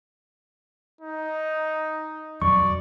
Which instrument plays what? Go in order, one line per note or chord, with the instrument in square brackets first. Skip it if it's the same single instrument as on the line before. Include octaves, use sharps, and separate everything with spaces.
[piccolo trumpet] D#4
[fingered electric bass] E1 F2 F#3 [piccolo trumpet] D5 [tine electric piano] C#6